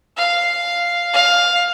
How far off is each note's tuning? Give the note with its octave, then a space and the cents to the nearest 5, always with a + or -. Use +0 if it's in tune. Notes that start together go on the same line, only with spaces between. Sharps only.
F5 -5
F5 +10